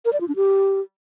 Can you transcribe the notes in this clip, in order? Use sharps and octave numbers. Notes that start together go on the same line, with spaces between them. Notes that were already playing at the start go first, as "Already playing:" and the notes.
A#4
D5
F4
D4
G4